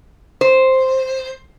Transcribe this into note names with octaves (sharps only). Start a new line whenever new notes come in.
C5